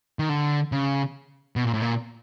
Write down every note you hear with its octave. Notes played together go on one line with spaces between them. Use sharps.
D#3
D3
C#3
B2
A#2
A2
A#2